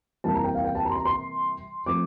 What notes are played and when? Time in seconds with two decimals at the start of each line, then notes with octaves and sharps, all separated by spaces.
0.24 C3 E3 G3 A#3 A5
0.35 A#5
0.44 G5
0.55 F5
0.64 G5
0.75 A5
0.85 A#5
0.90 C6
0.95 A#5
1.05 C6
1.86 F3 A3 C4 D6